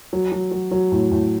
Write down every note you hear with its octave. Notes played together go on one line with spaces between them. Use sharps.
F#3
F#3
F#3
F#3
A2
A2